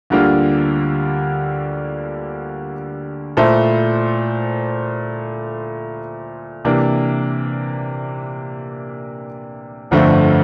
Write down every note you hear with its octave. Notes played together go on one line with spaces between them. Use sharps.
D2 D3 G3 A#3 F4
A#2 A3 E4 A4 C5
C3 E3 A#3 D4
G1 F2 D3 A3 C4